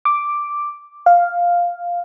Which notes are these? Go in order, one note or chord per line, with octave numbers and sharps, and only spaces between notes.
D6
F5